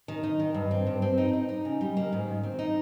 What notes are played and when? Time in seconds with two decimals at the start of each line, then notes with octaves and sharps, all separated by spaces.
0.08 D#3
0.23 D#4
0.40 D#3
0.54 G2
0.71 C4
0.87 G2
1.02 C4
1.18 D#4
1.33 D#4
1.49 D#4
1.65 C#3
1.81 G3
1.97 A#3
2.13 G#2
2.28 D#3
2.43 C4
2.59 D#4